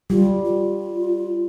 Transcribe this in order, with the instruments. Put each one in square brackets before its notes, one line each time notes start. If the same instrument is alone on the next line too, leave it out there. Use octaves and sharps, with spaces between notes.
[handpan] G3 [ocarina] F4
[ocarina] F4